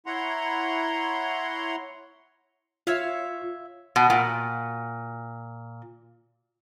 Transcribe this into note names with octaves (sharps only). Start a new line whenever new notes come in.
E4 C#5 F#5 A#5 C6
F4 C#5 E5 F5
B2
A#2